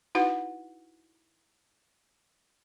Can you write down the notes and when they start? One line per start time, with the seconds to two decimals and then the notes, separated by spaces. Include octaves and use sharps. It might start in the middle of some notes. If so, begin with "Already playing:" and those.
0.15 D#4 E4 F#4 B4 F#5